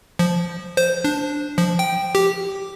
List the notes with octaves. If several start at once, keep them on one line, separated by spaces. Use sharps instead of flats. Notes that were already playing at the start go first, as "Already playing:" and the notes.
F3
C5
D4
F3
G5
G4